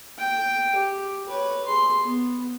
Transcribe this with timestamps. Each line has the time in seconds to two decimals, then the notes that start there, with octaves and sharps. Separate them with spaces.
0.18 G5
0.75 G4
1.29 B4 C#5
1.65 G#4 C6
2.03 B3